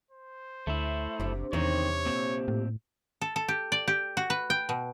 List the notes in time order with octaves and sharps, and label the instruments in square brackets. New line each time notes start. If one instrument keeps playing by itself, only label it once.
[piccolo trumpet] C5
[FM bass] D2 [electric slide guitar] A3 E4
[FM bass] F#1 [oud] D2 C3
[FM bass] E2 [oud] C3 D#4 [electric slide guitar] D#3 C4 [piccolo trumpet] C#5
[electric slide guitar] A#2 C4
[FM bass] A2
[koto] A4
A4
G4
D5
G4
F#4
B4
G5
B2